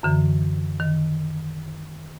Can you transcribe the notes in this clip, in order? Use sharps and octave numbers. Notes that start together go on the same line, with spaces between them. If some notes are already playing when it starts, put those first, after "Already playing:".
F#2 D3 E3
D#3